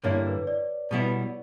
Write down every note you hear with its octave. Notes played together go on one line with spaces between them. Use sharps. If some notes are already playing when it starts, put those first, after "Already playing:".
G2 D3 A#3 E4 C#5
B4
D5
B2 G3 B3 E4